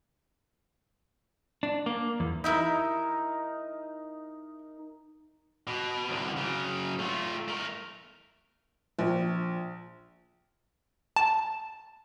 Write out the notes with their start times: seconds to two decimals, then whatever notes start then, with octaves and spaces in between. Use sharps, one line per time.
1.63 D4
1.86 A#3
2.20 E2
2.44 D#4 E4 A#4 E5 B5
5.67 B2
6.09 C2 D3
6.37 C#3 F#3
6.99 A3 F4
7.48 A3 A#4
8.99 A#1
11.16 A5